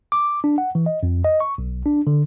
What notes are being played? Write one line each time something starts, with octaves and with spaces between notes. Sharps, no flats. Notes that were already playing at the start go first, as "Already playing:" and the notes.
D6
D4
F#5
E3
D#5
F2
D#5
C#6
B1
D4
D3